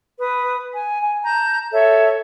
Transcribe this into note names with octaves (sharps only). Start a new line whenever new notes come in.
B4 D#6
G#5
G#5
A5 A#5 G6
A4 C#5 E5